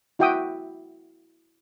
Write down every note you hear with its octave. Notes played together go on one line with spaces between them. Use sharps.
E4 F#4 E5 G5 D6 D#6